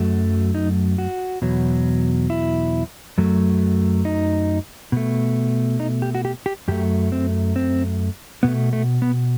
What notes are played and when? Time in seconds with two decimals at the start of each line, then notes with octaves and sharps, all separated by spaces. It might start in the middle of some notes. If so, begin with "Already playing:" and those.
Already playing: F#2 F#3 A3
0.55 D#4
0.98 F#4
1.42 E2 B2 F#3
2.30 E4
3.18 F#2 F#3 A3
4.05 D#4
4.92 B2 A3
5.80 D#4
6.02 G4
6.15 F#4
6.25 G4
6.46 G4
6.68 F#2 F#3 A3 G4
7.12 C4
7.56 C4
8.43 B2 A3 B3
8.73 A3
9.02 B3